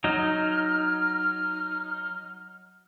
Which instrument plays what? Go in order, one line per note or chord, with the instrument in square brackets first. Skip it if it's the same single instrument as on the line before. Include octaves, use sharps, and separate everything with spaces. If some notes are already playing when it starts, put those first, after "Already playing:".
[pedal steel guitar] F#3 D#4 [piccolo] F6